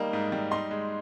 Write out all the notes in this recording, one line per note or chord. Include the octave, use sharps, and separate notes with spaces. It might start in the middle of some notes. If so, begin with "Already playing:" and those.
Already playing: G3 A#3 D#4
G#2
G3
D#4 C6
G#3